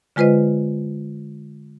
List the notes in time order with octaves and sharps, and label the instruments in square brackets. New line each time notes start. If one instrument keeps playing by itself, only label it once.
[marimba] D3 G#3 F4 B4 C5 D#5